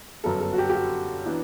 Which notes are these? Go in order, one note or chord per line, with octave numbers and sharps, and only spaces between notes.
G1 F#2 F#3 B3 A4
A4
F#4
G4
G4
F#4
E3 B3 D4